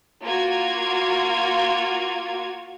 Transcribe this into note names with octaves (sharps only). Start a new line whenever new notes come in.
A#3 F4 F#4 G#6